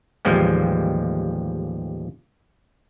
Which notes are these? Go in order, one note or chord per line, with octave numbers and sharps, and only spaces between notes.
A1 D#2 F3 G3 G#3